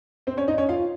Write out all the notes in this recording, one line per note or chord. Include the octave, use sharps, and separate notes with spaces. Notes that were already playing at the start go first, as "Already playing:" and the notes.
C4 C5
C#4 C#5
D#4 D#5
C#4 C#5
F4 F5